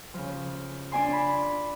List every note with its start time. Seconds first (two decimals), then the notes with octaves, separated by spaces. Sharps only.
0.14 C#3 F3
0.92 D4 D5 G#5 C6
1.12 B5